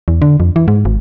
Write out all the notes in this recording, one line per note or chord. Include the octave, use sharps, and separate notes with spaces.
E2
D3
F2
E3
G#2
G#1